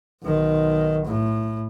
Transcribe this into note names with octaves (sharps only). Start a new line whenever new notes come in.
B1 D#3
A2